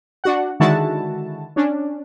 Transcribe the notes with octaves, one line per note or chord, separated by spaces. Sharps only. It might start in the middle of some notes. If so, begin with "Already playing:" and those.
D4 F#4 F#5
D3 D#3 G#3 E4 F#4 A5
C#4 D4